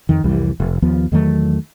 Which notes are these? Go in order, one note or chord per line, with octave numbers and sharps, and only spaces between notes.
F2 D#3
C2 F2 E3 G3
F1
D#2 F3 B3
E2 D#3 F#3 A3